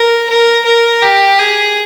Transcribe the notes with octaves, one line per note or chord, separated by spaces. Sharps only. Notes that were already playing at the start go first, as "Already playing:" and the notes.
Already playing: A#4
A#4
A#4
G4
G#4